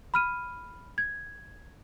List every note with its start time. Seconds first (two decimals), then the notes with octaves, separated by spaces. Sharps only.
0.14 B5 F6 D#7
0.98 G#6